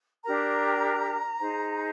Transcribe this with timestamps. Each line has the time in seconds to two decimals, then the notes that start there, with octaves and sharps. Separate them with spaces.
0.24 D4 G4 A#4 A#5
1.40 D#4 G#4 C5